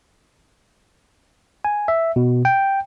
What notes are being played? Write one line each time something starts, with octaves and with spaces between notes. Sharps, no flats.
G#5
E5
B2
G5